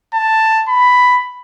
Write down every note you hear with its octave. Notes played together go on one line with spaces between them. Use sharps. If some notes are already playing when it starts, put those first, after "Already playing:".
A5
B5